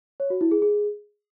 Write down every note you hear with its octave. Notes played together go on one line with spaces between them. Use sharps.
C#5
F#4
E4
G#4
G#4